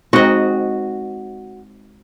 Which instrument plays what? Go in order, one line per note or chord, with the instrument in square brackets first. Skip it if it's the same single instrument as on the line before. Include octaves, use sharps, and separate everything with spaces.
[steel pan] G#3 C4 D#4 [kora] F#4 D#5